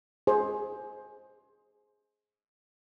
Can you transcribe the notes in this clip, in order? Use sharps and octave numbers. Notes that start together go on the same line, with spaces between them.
G#4 C5